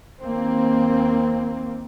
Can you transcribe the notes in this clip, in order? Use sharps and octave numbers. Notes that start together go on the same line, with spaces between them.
D#2 A#3 C4